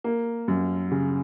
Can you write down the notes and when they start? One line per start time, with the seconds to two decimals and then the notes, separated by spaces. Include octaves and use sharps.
0.04 A#3
0.48 F#2
0.91 C#3